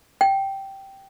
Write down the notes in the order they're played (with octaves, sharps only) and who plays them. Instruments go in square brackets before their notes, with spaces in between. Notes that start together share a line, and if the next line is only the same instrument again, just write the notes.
[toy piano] G5